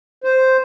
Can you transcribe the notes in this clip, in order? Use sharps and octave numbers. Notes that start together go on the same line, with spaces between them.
C5